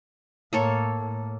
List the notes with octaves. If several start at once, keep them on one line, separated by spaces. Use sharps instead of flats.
A2 A#3 A4 C#5
A2